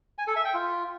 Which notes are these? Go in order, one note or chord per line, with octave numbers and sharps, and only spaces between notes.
G#5
A4
E5
G5
F4